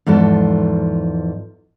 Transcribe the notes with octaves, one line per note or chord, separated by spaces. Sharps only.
E2 G#2 F3 A4